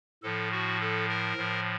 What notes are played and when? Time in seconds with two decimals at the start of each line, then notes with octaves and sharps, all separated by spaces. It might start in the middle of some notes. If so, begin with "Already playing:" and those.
0.23 A2 F3 A4
0.52 F#4
0.80 A4
1.09 A#4
1.37 A2 F3